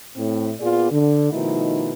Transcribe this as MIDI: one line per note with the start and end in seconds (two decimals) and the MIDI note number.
0.16 0.51 45
0.16 0.51 60
0.60 0.87 46
0.60 0.87 59
0.60 0.87 65
0.60 0.87 68
0.60 0.87 74
0.91 1.31 50
1.31 1.93 47
1.31 1.93 51
1.31 1.93 53
1.31 1.93 57
1.31 1.93 63
1.31 1.93 64